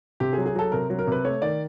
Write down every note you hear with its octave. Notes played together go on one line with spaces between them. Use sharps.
C3 G4
G#4
F#3
G#4
F#3 A4
C3 A#4
F#3
A#4
C3 B4
A3 C#5
D#3 D5